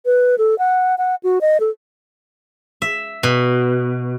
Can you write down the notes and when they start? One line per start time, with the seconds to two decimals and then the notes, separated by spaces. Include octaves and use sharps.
0.06 B4
0.38 A4
0.59 F#5
0.98 F#5
1.24 F#4
1.41 D#5
1.60 A4
2.82 E5
3.23 B2